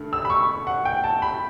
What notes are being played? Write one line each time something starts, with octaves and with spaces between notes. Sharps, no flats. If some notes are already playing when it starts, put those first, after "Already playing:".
Already playing: G2 D3 A3
E6
B5
C#6
F#5
G5
A5
B5